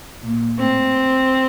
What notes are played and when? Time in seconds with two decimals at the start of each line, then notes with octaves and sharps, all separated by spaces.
0.23 A#2
0.58 A2 C4